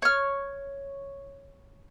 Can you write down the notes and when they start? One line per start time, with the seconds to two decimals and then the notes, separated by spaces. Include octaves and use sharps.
0.02 C#5 F6